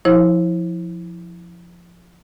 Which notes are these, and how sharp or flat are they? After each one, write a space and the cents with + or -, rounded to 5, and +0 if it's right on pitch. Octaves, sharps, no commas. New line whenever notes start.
F3 +0 E4 -15 C5 +40